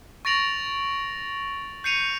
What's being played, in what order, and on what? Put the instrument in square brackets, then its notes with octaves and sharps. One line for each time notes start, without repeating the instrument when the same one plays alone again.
[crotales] C#6 A6 A#6 D7 F7 F#7
G6 C7 C#7 D#7 F7